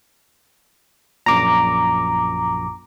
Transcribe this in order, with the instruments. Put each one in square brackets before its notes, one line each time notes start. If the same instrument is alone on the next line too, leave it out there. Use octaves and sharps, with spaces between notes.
[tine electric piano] A#1 F#2 A#2 [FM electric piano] A#5 D6